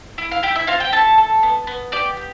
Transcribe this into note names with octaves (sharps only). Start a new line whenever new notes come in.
E4
F5
E4 G4 G5
E4 E5
C4 F4 F5
G4 G5
E4 A4 A5
A4
B3
B3
G4 D5 D6
G4